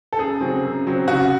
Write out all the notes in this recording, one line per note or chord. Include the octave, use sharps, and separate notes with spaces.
A4
F#2 G#4
C#3 F#3 C4
F#2
C#3 F#3 C4
C#3 F#4